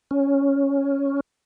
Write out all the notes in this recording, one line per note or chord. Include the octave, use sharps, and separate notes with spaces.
C#4